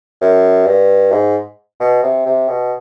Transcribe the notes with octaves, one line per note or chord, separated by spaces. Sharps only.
F#2
G2
G#2
B2
C3
C3
B2